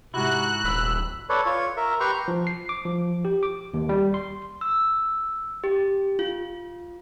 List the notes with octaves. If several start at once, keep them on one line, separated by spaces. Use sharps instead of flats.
G#2 C3 E4 F#4 F#6
D#1 B5 E6
A4 B4 C#5 D5
F4 C#5
A#4 E5
G4 B4 G5 A#5 C6 C#6
F3
C7
D6
F3
G4
D6
D#2
G3
C6
E6
G4
F4